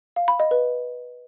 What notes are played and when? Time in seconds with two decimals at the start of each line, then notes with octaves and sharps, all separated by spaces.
0.16 F5
0.28 B5
0.40 D#5
0.51 B4